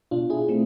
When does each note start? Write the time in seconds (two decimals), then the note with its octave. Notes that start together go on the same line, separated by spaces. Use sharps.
0.11 B2 D4 F4
0.30 E4 G#4
0.48 A3 C4